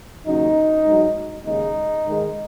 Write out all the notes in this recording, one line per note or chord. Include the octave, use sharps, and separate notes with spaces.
D#2 C#3 F#3 D#4
G#2 F#3
D#2 C#3 G#3 D#4
G#2 D#3 G#3